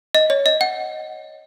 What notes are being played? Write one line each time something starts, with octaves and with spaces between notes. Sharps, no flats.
D#5
C#5
D#5
F#5